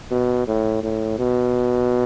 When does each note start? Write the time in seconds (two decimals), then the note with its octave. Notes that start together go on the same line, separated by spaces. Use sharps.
0.11 B2
0.48 A2
0.83 A2
1.19 B2